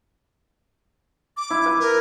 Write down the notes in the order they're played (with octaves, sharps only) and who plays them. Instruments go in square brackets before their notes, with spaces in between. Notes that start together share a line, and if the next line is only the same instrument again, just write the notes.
[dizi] D6
[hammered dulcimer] E4
B4
[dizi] A#4